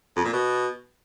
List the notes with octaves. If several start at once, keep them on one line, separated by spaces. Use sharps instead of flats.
F2
A#2
B2